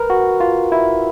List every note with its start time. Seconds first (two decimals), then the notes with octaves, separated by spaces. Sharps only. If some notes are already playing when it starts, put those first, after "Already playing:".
Already playing: A#4 B4
0.10 F#4
0.40 F4
0.72 E4